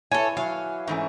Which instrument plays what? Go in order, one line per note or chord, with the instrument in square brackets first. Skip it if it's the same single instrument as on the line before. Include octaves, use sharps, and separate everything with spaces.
[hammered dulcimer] E3 [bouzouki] A4 C#5 [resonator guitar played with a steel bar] G#5
[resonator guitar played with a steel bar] F#3 [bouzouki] F5 [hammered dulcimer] G#5
[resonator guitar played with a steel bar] G#2 E3 A3 [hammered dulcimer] C#4 F#4